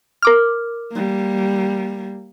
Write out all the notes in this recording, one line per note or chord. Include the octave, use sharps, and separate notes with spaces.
A#4 D6 F6
G3 A#3